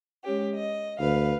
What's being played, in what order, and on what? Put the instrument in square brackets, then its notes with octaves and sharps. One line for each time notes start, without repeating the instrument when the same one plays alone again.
[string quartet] G#3 C#4 G4
D#5
[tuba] D2 [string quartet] B4 F5